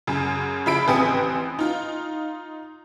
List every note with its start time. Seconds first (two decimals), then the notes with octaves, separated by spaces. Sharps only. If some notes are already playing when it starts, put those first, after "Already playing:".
0.07 F#2 C#3
0.66 C#3 F3 E5 B5 D7
0.88 A1 C4 B4 G#5 D#6 C#7
1.59 D#4 F4